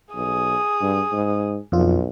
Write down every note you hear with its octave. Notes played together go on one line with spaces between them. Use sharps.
B1 G#4 D#6
G2
G#2
B1 F2 F4